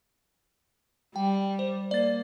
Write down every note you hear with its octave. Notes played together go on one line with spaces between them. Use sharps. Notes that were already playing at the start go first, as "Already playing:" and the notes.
G3 G5
C5
A#3 D5 A6